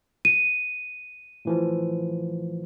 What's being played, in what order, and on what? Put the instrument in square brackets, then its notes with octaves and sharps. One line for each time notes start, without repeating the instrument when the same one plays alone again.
[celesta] D#7
[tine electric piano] A2 E3 F3